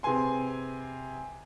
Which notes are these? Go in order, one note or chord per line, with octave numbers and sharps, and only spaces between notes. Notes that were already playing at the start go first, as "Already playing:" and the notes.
C3 G#4 B4 G#5 C6